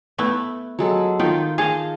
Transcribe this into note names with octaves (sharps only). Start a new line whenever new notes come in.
A3 B3 E4
F#3 G#3 A4
D#3 D#4 F4 G5
G#4 D#5 F5 A5